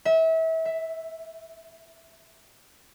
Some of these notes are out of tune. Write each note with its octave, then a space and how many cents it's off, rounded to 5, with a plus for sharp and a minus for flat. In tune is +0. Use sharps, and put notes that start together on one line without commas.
E5 -30
E5 +5